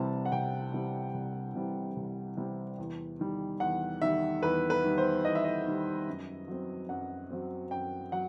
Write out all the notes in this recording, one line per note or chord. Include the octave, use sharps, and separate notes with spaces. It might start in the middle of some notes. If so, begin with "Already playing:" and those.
Already playing: C2 C3 E3 G3 C4 A5
F#5
C2 G5
C3 E3 G3 C4
C2
C3 E3 G3 C4
C2
C3 E3 G3 C4
E2
D#3 G3
E2 F#5
D#3 G3 E5
E2 B4
B4
D#3 G3
C5
E2 D#5
E5
D#5
D#3 G3
F#2
F#3 C4
F#2 F#5
F#3 C4
F#2 G5
F#3 F#5